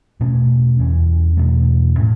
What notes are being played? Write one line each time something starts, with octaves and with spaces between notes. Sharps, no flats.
E2 B2 A3 C#4
E2 E3 C#4
E2 B2 F#3 A3
A2 A3 C#4